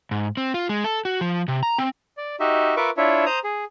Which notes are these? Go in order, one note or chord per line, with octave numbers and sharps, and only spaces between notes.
G#2
C4
F4
G#3
A4
F#4
F3
C3
A#5
C4
D5
D#4 F#4 G4 D#5 E5
F4 A#4 B4 E5 C#6 D6
D4 E4 F4 C#5 E5
C5 A#5 D#6
G#4